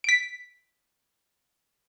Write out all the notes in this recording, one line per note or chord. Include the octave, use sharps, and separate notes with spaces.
B6 D7